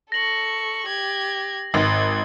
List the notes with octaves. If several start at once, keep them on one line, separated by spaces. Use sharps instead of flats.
A4 C#6 A#6 F#7
G4 G#6
G#1 G#6